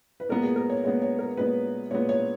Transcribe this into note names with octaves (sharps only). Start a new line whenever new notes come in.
B4
A#2 G#3 B3 A#4
G#4
A#4
C#5
A#2 G#3 B3 C#5
C#5
A#4
A#2 G#3 B3 B4
A#2 G#3 B3 C#5
C#5